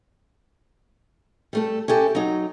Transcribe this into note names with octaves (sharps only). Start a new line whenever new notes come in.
G3 A3 A4
C#4 E4 G4 A4
F#3 D#4